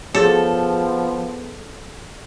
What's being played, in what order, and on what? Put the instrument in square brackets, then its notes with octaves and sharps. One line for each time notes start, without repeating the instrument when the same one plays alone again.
[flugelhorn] F3 [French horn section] B3 [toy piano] F#4 G#4 C#5 [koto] A4